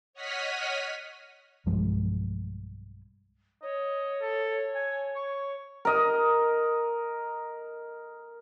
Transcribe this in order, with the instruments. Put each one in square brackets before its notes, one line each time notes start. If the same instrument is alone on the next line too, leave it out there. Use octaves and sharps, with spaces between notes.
[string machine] C#5 D#5 F#5 D#6 F6 B6
[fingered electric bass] B1 G2 F3 G#3
[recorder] C#5 [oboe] D#5
[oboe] A4
G#5
C#6
[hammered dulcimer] A#4 D#5